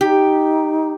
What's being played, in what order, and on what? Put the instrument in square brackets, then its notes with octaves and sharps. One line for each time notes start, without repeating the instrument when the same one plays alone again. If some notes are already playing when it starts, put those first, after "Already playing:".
[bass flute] D#4 [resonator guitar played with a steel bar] G4